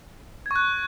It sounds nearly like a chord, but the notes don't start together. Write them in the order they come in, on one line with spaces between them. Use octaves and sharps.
G#6 C#6 F#6